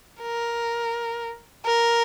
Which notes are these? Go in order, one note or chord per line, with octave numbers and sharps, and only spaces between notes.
A#4
A#4